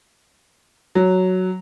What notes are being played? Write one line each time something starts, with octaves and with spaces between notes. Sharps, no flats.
F#3